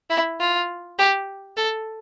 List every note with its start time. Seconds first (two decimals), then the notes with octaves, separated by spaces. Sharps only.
0.10 E4
0.40 F4
0.99 G4
1.57 A4